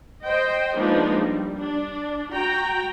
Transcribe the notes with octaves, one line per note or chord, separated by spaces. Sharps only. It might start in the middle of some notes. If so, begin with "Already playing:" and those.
C5 D#5 G5
F3 G#3 A#3 B3 D4 D#4
G3
D4
F#4 G5 A#5